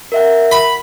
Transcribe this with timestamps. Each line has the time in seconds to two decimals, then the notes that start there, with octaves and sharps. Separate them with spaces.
0.12 A#4 E5 F#5
0.52 B5